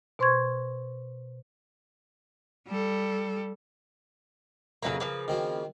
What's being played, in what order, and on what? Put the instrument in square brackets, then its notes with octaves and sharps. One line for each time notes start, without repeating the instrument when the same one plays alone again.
[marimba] B2 C5 C6 C#6 G#6
[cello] G3 A4
[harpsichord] F2 B4 E5 [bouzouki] C#3 F#3 A#3
[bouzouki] C#3 F3 A#3 [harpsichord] B4
[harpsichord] D#3 C4 F#4